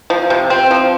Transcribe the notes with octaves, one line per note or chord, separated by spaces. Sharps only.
F3
C3
C4
F3